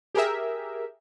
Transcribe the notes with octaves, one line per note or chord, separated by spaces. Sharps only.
G4 G#4 A#4 E5